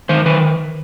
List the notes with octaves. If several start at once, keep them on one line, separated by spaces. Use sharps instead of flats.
D#3 C5
D#3 B4